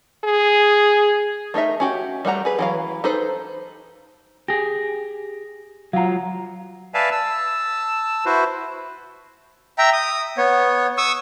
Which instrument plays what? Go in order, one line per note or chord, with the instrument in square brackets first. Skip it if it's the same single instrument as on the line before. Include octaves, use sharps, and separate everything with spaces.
[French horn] G#4
[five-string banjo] A3 D#4 A#4 E5
C#4 F#4 G4
G3 A3 F#5 A#5
G#4 B4
E3 F#3 F5
D#4 A4 B4 C5
[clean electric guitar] G4 G#4 [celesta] A#6
[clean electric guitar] F#3 F4 [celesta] F5 F#5 A#5
[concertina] B4 D5 E5 F5 G#5 A5
A5 E6
E4 F#4 B4 C5
[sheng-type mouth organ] E5 G5 A#5
D#6
B3 C#5
C#6 D#6 E6